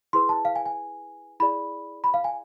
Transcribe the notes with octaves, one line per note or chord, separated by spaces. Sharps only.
E4 G#4 B4 C6
A5
F5
G#5
G#5
E4 G#4 D5 B5
B5
F5
G#5